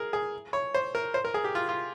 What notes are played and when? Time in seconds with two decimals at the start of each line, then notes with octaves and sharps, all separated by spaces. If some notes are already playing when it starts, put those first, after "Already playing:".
Already playing: G#4 A#4
0.13 G#4
0.53 C#5
0.75 C5
0.95 A#4
1.14 C5
1.25 A#4
1.34 G#4
1.44 G4
1.55 F4
1.69 F4